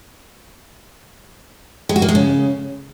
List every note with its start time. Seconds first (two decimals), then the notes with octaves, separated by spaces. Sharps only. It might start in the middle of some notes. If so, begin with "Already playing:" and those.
1.89 G#3
1.96 F#4
2.02 A#3
2.09 G#3
2.15 C#3